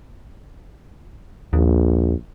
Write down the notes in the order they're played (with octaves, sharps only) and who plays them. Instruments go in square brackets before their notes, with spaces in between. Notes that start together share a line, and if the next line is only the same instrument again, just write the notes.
[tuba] A#1 [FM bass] D#2